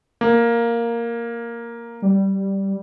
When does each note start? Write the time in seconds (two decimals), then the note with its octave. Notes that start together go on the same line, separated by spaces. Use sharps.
0.21 A#3
2.02 G3